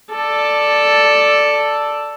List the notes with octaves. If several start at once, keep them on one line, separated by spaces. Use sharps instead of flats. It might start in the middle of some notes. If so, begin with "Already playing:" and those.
A4 D5